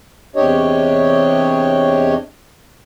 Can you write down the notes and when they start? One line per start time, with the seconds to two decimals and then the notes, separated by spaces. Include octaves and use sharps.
0.36 E2 C3 D4 G4 C#5 D#5